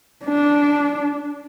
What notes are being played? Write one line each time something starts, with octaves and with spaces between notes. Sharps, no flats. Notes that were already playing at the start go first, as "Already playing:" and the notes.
D4